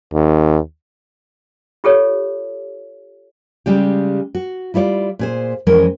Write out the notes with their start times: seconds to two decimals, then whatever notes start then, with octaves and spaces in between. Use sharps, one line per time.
0.14 D#2
1.84 F4 G4 A4 C#5
3.66 C#3 G3 G#3 G4
4.35 F#4
4.74 G3 E4 F4 C#5 D5
5.19 A#2 G#4 C5
5.67 F2 E3 G#3 C#4 A#4